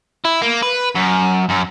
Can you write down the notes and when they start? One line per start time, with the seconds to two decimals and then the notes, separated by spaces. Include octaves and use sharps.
0.25 E4
0.42 A#3
0.63 B4
0.96 F#2
1.49 F#2